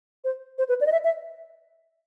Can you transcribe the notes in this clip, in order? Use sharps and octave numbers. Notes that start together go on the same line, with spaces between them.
C5
C5
B4
D5
D#5
E5
E5